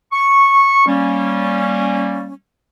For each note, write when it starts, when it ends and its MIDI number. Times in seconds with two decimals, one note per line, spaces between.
0.12 0.84 85
0.87 2.32 55
0.87 2.32 58
0.87 2.32 61